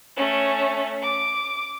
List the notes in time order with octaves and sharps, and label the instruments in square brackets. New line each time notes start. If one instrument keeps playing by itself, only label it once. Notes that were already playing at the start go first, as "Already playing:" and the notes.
[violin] A3 C#4
D6